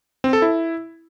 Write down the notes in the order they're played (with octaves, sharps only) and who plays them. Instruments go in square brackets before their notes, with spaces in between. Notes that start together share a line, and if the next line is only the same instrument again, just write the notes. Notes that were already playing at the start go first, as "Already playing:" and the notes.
[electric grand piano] C4
A4
E4